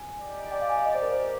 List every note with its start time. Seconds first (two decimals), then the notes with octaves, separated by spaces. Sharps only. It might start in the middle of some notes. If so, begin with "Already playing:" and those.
Already playing: G#5
0.19 D#4 G4 D5
0.51 G5
0.61 F5
0.70 G#5
0.78 F5
0.85 D#5
0.94 C5
1.02 A#4
1.12 C5